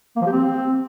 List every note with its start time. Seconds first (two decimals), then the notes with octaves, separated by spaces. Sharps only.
0.16 A#3
0.21 F3
0.26 G4
0.32 C4